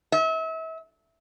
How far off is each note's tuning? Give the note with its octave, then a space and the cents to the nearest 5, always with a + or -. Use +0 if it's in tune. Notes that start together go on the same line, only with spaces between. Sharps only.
E5 -35